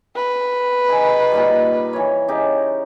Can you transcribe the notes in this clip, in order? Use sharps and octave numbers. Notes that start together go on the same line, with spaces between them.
B4
D#4 G#4
A#2 D#3 G3
E3 C#5
C#3 D#4 G4